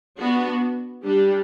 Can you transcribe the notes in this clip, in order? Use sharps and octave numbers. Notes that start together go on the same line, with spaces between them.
B3 D4 F#4
G3 D4 G4